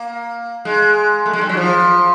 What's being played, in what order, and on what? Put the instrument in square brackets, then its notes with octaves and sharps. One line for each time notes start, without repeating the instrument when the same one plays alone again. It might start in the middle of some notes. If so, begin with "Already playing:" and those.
Already playing: [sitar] A#3
G#3
A3
G#3
G3
F#3
F3